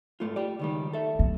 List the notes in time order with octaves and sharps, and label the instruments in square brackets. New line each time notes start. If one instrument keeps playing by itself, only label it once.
[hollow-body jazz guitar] G#2 A3 F4
G4 D5
C#2 D#3 G3
A4 E5
[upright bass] F#3